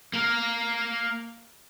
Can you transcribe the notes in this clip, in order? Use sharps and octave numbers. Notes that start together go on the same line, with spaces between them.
A#3 A#4